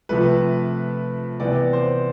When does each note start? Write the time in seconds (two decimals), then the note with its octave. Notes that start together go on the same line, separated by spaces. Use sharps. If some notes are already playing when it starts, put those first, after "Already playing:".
0.09 C3 F3 A3 B4
1.40 C3 E3 B3 D5
1.73 C5